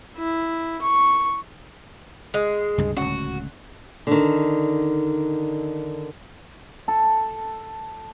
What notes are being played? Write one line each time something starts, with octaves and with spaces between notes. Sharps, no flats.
E4
C#6
G#3
C#2 G2 C3
D1 C#2 C#4 F#4
D3 D#3
A4